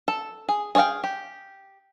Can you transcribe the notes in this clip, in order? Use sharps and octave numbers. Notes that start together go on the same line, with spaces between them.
A4
G#4
G#4 C#5 D5 F5 G5
G4